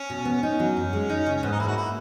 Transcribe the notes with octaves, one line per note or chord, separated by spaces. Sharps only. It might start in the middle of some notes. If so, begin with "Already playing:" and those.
Already playing: C#4
B2
B3
C#4 D#4
F#3
F#2
G#3
D#4
C#3
C#4
G#2 B3
D#4
A#3 E4
F#4
E4